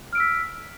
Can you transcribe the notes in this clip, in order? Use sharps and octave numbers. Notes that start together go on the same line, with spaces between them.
E6 F6 B6 D7